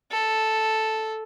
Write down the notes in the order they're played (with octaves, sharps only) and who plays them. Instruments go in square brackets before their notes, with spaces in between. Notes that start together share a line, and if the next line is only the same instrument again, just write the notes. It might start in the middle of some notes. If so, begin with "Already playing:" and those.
[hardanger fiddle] A4